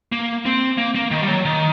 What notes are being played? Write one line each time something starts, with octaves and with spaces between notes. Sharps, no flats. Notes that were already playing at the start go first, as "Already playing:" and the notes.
A#3
C4
A#3
A#3
D#3
G3
F#3
D#3